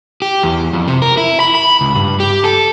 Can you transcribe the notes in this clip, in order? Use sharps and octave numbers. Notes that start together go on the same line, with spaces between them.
G4
E2
F2
C3
A#4
E4
B5
B5
C#2
G2
G4
A4